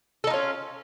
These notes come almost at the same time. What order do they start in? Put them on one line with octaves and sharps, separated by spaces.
A4 D#4 F4 C#4